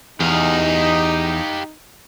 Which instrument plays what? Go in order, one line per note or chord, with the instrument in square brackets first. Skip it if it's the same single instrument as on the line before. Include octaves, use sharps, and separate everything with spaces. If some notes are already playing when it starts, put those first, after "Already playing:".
[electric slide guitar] E2 [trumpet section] D#4 [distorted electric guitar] G4 F5